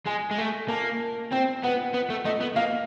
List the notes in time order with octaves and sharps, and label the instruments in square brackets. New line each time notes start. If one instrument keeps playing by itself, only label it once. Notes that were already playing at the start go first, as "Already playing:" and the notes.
[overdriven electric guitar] G#3 [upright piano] G#5
[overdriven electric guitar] G#3
A3
[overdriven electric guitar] A#3 [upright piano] A5
[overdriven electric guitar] C4 [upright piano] G5
[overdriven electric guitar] B3 [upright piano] F#5
[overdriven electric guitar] B3
A3
[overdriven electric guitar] A3 [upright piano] D#5
[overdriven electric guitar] B3
[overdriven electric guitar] A#3 [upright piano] F5